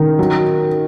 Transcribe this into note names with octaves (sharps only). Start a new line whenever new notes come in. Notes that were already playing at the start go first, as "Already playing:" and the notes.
Already playing: D#3
F#3